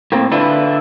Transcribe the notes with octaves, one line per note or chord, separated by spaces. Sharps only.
A2 A#3 C4
D3 D4 E4 F4 B4